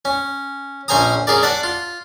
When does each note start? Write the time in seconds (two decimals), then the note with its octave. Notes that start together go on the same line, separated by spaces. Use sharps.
0.05 C#4
0.88 A#1 C#4 C5 G#5 A#5 D#6
1.27 C#4 G#4 A#4 D5
1.43 D4 D5 F#5
1.63 F4